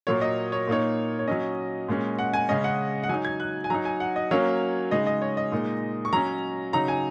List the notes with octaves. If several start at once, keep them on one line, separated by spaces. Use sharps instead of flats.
A#2 F#3 A#3 C#5
D#5
C#5
A#2 A#3 D#4 C#5
C#5
F#3 C#4 D#5
A#2 G#3 C#4
F#5
G#5
C#3 G#3 C#4 D#5
F#5
F#5
F#3 D#4 G#5
G#6
F#6
G#5
F#3 D#4 A#5
G#5
F#5
D#5
F#3 A#3 C#4 C#5
C#3 G#3 D#4 D#5
D#5
C#5
D#5
A#2 G#3 D#4
C#6
F#3 C#4 A#5
C#3 F#3 D#4 A#5
G#5